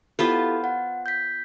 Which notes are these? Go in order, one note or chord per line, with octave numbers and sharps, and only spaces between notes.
B3 E4 F4 G4 A4 C5
F#5
G6 B6